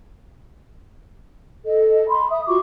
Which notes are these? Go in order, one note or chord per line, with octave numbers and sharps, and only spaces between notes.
A4 D#5
B5 C6
E5 D#6
F4 F#4 C#6 D6